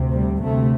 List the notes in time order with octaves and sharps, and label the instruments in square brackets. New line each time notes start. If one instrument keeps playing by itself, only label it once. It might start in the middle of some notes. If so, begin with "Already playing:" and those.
Already playing: [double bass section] D2 C3
G3
D2 C3 A3